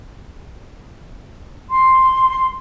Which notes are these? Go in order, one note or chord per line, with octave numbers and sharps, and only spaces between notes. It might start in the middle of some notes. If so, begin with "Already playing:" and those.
C6